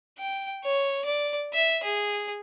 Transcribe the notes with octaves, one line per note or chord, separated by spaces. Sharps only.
G5
C#5
D5
E5
G#4